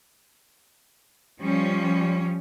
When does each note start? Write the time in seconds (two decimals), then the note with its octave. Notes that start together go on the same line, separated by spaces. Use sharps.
1.40 F3 G3 C#4